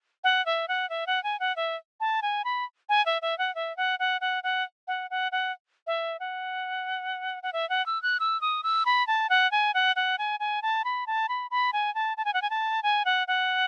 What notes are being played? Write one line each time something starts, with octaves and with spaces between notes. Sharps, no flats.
F#5
E5
F#5
E5
F#5
G#5
F#5
E5
A5
G#5
B5
G#5
E5
E5
F#5
E5
F#5
F#5
F#5
F#5
F#5
F#5
F#5
E5
F#5
F#5
E5
F#5
E6
F#6
E6
D#6
E6
B5
A5
F#5
G#5
F#5
F#5
G#5
G#5
A5
B5
A5
B5
B5
G#5
A5
A5
G#5
F#5
G#5
A5
G#5
F#5
F#5